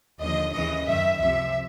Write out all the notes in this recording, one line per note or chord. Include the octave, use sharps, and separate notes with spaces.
D#2 D3 F3 D#5
D#2 C#3 E3 D#5
F#2 D#3 E5
C#2 C3 F3 E5